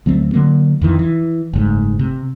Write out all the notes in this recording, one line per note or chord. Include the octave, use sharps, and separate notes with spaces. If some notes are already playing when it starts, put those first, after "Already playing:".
D2 F#3 A3 C4
D3 F#3 A#3
F2 D#3 E3
E3
F#1 G#2 A3
C3